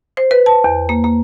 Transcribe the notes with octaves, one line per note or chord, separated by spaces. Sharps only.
C5
B4
A5
E2
A#3
A#3